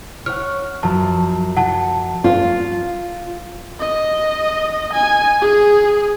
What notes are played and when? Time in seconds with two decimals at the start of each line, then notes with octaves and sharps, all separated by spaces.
0.26 C#5 F#5 F6
0.83 F#2 F3 A5
1.57 F#5 A5
1.69 C#7
2.24 F4
3.80 D#5
4.93 G#5
5.41 G#4